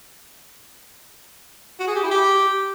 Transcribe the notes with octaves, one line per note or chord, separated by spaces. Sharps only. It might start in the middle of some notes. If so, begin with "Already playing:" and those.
F#4
G#4
G4
E4
G4